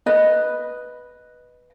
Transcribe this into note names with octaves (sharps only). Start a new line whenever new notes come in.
B4 D#5